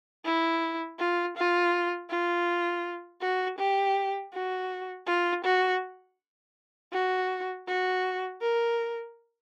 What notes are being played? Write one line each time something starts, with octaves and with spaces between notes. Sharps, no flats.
E4
F4
F4
F4
F#4
G4
F#4
F4
F#4
F#4
F#4
A#4